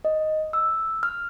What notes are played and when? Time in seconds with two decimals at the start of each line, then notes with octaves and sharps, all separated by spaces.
0.05 D#5
0.53 E6
1.03 F6